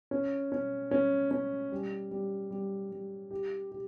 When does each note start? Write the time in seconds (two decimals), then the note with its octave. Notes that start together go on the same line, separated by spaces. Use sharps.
0.11 C#4
0.52 C#4
0.91 C#4
1.31 C#4
1.72 G3
2.11 G3
2.51 G3
2.92 G3
3.31 G4
3.72 G4